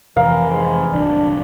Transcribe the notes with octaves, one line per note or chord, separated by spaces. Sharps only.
F2 C3 E3 C4 A#4 F5
G#2
D1 C2 D4